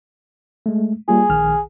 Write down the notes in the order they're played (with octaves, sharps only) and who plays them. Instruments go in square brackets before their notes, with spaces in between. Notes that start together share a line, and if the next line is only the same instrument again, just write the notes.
[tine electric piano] G#3 A3
[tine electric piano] G3 A#3 F4 [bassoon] G#4
[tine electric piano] A#1 D#3 F6